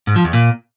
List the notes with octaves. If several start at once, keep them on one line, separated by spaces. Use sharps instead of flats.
G#2
F3
E2
A#2